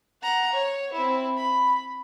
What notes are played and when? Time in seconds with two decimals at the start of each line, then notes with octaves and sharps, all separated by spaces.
0.22 F#5 A#5
0.53 C#5
0.93 C4 E4
1.37 B5